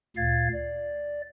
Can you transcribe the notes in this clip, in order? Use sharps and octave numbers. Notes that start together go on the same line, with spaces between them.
D2 A#2 F5 G#6 A6
D5